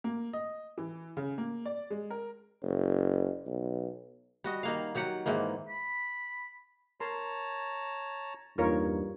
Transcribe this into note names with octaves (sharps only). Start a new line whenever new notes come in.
A#3
D#5
E3
C#3
A#3
D5
G#3
A#4
F#1
B1
G3 F#4 D#5
D#3 A#3 F5
D#3 F#3 G4 F#5
G#2 D#3 E3 A#3
B5
A#4 C#5 A5 A#5 C6
E2 G2 A#3 D#4 F4 A#4 C#5